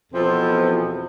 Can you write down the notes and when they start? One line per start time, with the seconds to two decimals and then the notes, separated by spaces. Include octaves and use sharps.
0.12 E2 B2 F3 C4 A4